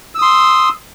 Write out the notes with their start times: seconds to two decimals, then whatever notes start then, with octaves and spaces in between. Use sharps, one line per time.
0.15 E6
0.18 D#6
0.22 C6